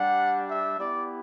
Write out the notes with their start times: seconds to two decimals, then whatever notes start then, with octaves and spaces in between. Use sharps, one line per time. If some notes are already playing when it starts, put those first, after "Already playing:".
Already playing: G3 D4 G4 F#5
0.49 E5
0.78 B3 E4 G4 D5